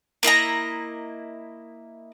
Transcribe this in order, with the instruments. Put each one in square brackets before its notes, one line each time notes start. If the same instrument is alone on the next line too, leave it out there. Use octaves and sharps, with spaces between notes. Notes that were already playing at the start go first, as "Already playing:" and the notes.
[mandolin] A#3 E4 D#5 A#5